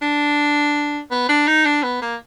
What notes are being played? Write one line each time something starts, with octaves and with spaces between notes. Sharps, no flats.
D4
B3
D4
D#4
D4
B3
A#3